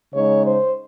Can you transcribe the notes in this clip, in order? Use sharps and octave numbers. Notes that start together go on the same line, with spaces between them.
C#3 G#3 D#4 C#5
C5